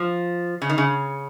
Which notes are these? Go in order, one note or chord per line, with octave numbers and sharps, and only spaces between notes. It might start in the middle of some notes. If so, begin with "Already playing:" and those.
Already playing: F3
C#3
D#3
C#3